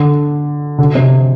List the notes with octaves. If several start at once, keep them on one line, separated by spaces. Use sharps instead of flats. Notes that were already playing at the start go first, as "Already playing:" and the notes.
Already playing: D3
D3
C3